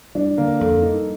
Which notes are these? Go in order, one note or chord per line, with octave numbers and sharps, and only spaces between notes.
G3 D4
D3 A#3
F2 A4
G2 D#4